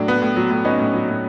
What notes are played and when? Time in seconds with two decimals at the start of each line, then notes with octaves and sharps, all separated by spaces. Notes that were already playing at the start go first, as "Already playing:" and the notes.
Already playing: A2 F#3 D4
0.08 B3
0.22 A2
0.36 F#3
0.50 A2
0.65 B3 C#4 D#4
0.79 A2
0.94 F#3
1.08 A2